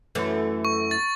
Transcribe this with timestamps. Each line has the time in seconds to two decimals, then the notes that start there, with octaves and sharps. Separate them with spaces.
0.15 F#2 E3 A3
0.65 C#6
0.91 A6